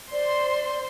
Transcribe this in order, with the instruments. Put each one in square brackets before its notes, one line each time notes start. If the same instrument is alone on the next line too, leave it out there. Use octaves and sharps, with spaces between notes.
[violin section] C5 C6 [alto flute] D5